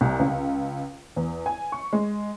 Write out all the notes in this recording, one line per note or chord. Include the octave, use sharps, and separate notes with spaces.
C2
C#2
E2
G#5
C#6
G#3